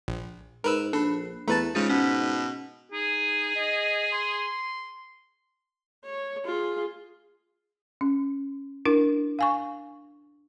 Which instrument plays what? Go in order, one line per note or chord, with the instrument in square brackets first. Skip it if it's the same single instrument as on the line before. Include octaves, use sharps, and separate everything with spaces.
[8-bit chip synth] A#1
[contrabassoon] G#2 [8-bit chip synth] A#4 B4 E6
[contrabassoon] A#1 [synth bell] D4 B5 [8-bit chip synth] A4
[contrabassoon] E2 [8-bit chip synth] A3 B4 A5 [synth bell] A#5 A6
[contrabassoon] G#2 [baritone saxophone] C#3 [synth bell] G#3 D#4 F4
[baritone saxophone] B2 [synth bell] C#4
[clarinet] D#4 [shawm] G#4
[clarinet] D#5
C6
[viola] C#5
F4 G#4
[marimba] C#4
D4 E4 A#4
F5 G#5 C#6